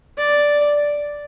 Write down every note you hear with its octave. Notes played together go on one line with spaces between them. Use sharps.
D5